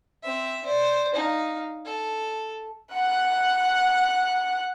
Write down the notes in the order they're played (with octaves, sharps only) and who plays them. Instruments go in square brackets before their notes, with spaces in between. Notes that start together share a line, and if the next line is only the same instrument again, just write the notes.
[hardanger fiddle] C4 E5
C5 D5
D#4 F5
A4
[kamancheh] F#5 F#6